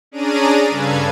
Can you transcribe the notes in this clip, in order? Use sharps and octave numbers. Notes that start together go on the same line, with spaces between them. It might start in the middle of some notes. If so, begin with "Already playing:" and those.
C#4 D4 G#4 D5 A#5 D#7
G2 C#3 A4 B4 F5 G#6